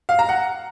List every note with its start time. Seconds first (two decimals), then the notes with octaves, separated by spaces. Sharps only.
0.09 F5
0.19 A#5
0.29 F#5